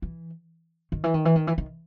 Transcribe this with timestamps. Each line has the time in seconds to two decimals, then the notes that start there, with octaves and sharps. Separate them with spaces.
0.02 E3
0.92 D#3
1.04 E3
1.14 D#3
1.25 E3
1.36 D#3
1.47 E3
1.58 D#3